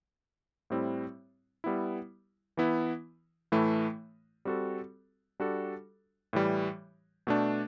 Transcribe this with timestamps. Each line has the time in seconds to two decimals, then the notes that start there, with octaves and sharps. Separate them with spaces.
0.70 A2 G3 C4 E4
1.64 G3 B3 E4
2.57 E3 B3 E4
3.52 A2 E3 A3 E4
4.45 G3 C4 F#4 A4
5.40 G3 D4 F#4 A4
6.33 A2 E3 G3
7.27 B2 A3 D4